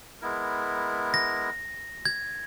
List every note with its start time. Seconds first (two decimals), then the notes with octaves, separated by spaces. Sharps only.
0.21 G#3 B3 E4 A#4
1.14 A#6
2.05 G#6